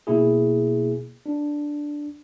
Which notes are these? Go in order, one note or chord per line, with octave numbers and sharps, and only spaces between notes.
B2 A#3 E4 G#4
D4